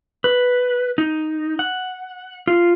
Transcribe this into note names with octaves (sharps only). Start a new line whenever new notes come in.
B4
D#4
F#5
F4